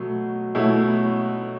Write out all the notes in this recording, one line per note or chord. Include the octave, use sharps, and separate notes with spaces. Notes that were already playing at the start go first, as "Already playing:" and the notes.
Already playing: B2 F#3 A3
B2 F#3 A3 E4